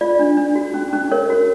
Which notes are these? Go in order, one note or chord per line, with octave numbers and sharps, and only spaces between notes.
F4 D5
D4
D4
F#4
C#4
C#4
A#4 C#5
F#4